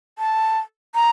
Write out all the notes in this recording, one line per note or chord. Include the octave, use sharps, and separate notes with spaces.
A5
A#5